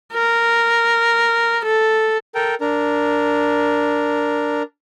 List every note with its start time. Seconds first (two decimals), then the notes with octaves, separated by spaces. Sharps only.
0.14 A#4
1.65 A4
2.35 A4 A#4 G5
2.61 D4 A#4